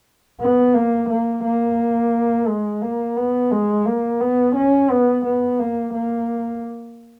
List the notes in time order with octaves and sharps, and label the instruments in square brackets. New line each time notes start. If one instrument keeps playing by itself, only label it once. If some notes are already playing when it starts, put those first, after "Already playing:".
[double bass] B3
A#3
A#3
A#3
G#3
A#3
B3
G#3
A#3
B3
C#4
B3
B3
A#3
A#3